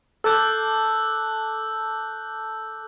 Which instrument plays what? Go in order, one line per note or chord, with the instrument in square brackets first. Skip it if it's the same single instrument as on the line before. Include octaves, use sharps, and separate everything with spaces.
[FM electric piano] A4 A5 D6 [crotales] E6 F#6 G6